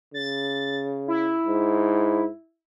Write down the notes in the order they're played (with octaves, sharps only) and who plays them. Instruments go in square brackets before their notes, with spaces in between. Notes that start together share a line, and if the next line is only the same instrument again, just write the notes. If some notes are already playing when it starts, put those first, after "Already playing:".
[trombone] C#3 [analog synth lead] A6
[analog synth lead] E4
[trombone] G#2